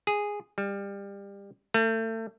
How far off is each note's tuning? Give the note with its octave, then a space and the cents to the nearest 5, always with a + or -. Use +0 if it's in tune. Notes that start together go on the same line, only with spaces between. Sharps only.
G#4 -5
G3 +25
A3 +30